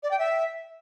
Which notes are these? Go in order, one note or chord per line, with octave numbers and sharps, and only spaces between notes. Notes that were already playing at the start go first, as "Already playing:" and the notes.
D5
G5
E5